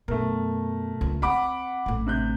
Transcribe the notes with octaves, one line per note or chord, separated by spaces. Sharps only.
F#2 B2 A3 A#4
C#2
C4 F#5 B5 D6
A1 A3
C3 F#6 G6